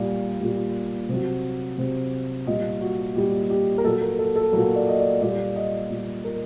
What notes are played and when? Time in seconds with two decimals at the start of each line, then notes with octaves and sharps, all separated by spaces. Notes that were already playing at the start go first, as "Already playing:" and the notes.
Already playing: A#2 G3 D5
0.41 A#2 G3
1.09 C3 F#3
1.78 C3 F#3
2.47 A#2 G3 D#5
2.81 F#4
3.16 A#2 G3 G4
3.50 G4
3.78 A#4
3.85 A#2 F#3 A4
4.02 A#4
4.19 A4
4.36 A4
4.53 F#3 A#4
4.57 A#2
4.76 D5
4.88 D#5
4.99 D5
5.21 A#2 G3 D5
5.56 D#5
5.90 A#2 G3
6.25 A#4